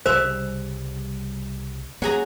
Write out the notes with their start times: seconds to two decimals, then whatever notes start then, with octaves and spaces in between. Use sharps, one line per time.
0.06 C2 C#3 G3 C5 E5
2.02 F#3 A#3 C#4 G#4 A#5